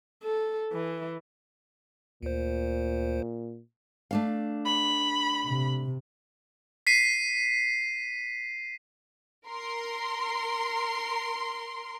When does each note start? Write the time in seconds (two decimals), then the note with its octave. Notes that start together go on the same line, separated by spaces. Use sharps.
0.23 A4
0.72 E3
2.23 D2 A#2 C5
4.11 A3 D4 F5
4.65 B5
5.47 C3
6.87 B6 C7 D#7
9.48 A#4 C6